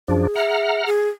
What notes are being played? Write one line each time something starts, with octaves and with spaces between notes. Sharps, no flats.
F#2 F3 D4 G#4
E5 F#5 A#5 F6
G#4